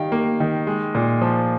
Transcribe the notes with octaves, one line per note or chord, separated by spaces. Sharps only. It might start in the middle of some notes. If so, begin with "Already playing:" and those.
Already playing: D#3 G3 F5 G5
A#3
D#3
G#3
A#2
F3